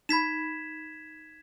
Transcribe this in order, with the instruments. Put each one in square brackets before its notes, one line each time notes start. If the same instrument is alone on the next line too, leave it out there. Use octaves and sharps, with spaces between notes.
[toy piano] D#4 B5 [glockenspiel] G#6 B6 E7